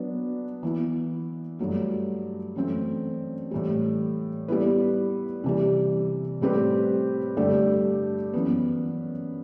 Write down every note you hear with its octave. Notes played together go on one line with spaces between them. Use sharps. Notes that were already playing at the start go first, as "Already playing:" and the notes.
Already playing: F#3 B3 D4
E3 B3 E4
G2 F#3 A3
F#2 E3 A3 C4
A2 E3 G3
G3 B3 E4 B4
C3 E3 G3
A2 G3 C4 G4 B4
G2 D3 A3 D4 G4
F#2 E3 B3